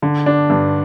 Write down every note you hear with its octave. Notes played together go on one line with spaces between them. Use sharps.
D3
D4
G2